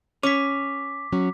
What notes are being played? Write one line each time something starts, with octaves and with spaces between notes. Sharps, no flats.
C#4 D6 B6
F#3 C#4